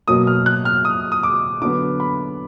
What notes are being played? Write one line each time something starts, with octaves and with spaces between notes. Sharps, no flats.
B2 F#3 A#3 D#6
F6
F#6
F6
D#6
D#6
D6
D3 F#3 B3 D6
B5